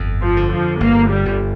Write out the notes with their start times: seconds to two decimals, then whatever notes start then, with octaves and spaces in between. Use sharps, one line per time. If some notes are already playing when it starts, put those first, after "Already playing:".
Already playing: G1 F2
0.22 F3
0.37 D3
0.52 F3
0.80 G1 A#3
1.10 G3
1.25 G1